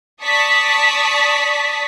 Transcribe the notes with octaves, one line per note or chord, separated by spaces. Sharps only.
D5 A5 C#6 D#6 B6